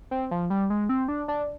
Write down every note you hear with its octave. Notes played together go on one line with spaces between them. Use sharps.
C4
F3
G3
G#3
C4
D4
D4